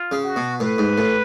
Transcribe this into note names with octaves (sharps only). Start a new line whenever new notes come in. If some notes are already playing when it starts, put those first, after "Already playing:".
Already playing: F4
C#3
F#4
B2
A2 B4
G#2
A2